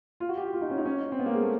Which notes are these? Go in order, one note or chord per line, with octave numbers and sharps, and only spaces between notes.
F4
F#4
G4
F#4
F4
D#4
C#4
D#4
C#4
C4
B3
A#3
G#3
A3